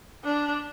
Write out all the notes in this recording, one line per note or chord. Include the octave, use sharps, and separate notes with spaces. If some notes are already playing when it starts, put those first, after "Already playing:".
D4